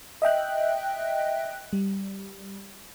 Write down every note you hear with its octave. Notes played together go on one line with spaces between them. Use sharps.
D#5 E5 G5 F#6
G3